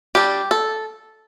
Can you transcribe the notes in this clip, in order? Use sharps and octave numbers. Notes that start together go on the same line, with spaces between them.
G3 D4 G4
A4